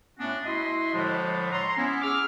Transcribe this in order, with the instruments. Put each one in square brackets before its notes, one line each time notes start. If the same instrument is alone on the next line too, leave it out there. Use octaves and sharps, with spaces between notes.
[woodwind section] A2 A3 B3 C#4 D4 F#4
E4 F#4 D#5 E5 C6
A2 D3 F3 G#3 A3 D4
C#5 A#5 C6
B3 C#4 E4
C#4 G#4 D6 E6 F6